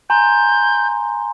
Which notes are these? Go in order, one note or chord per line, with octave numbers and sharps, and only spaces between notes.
G#5 A#5 C6 G6